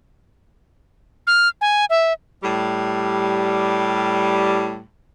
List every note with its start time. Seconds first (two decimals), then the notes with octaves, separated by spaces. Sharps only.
1.27 F6
1.61 G#5
1.90 E5
2.43 A2 G3